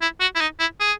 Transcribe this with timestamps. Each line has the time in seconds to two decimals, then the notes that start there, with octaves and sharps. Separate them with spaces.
0.01 E4
0.21 F#4
0.35 E4
0.41 D#4
0.60 E4
0.80 G#4